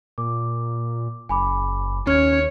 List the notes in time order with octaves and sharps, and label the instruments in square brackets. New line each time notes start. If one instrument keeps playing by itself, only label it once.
[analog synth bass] A#2 [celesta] D6
[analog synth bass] F#1 [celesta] G#5 B5 D6
[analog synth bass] D#2 [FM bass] C#4 [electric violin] C#5 [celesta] F6 G#6